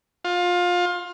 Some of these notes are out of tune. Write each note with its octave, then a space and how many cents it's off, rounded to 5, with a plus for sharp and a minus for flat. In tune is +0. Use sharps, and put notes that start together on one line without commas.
F4 +25